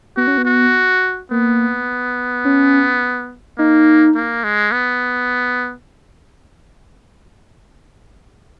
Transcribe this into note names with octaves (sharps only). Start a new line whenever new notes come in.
B3 F#4
C#4
B3
F#4
A#3 B3
C#4
A#3 D#4
A#3
G#3
B3